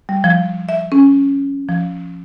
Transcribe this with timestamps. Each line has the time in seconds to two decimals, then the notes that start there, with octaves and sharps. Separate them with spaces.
0.09 G3
0.24 F3
0.69 E5
0.92 C#4
1.69 F3